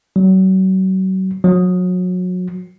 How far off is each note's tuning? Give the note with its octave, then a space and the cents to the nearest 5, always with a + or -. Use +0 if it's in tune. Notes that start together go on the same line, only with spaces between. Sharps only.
F#3 +35
F#3 -30